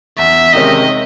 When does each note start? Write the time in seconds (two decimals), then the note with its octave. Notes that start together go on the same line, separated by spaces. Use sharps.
0.18 E2 E5
0.53 C3 D#3 G#3 C#4 D#5